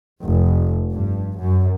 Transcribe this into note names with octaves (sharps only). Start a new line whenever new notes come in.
F1
G2
F#2